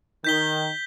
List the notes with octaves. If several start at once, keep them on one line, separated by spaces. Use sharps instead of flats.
D#3 G6 B6 G7